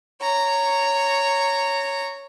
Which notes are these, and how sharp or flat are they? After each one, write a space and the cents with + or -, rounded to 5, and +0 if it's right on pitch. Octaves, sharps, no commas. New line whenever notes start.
C#5 +0 A#5 -15